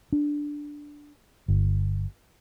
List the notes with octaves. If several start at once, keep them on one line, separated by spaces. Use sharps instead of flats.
D4
G1